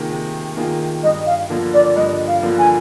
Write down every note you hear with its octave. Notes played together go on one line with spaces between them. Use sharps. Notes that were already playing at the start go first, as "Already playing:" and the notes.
Already playing: C3 D#3 A#3 F4 G#4
C3
D#3 A#3 F4 G#4
G2 D#5
F5
D3 F3 A#3
D5
G2 D#5
F5
D3 F3 A#3
G#5